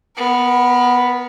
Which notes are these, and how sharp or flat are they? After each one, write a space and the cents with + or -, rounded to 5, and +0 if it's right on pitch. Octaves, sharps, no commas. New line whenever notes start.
B3 +0 A#4 +35